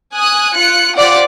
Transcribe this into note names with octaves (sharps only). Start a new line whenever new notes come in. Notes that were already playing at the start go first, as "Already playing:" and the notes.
G#5 D#6 F#6
F4 F#6 C#7
F4 G4 C5 D5 F5 F#5